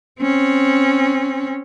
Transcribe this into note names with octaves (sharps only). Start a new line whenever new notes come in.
C4 C#4